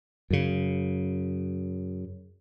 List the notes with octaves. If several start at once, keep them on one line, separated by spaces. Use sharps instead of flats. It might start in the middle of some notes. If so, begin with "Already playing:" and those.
F#2 C#3